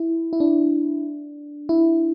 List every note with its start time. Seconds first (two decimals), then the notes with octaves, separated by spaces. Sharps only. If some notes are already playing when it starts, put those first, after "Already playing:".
Already playing: E4
0.33 E4
0.40 D4
1.69 E4